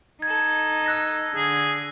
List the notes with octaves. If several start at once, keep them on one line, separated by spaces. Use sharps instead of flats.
D#4 A4 G#6
E6 F#6 A#6
D3 G#4